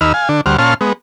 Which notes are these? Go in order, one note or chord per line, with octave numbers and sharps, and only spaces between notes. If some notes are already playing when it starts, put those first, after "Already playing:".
D#2 D#4 B5 E6 F6
F5 G#5
D3 D4
D2 G3 C5 F#5 F6
A#2 C#4 F5 A5 C6 F6
G#3 B3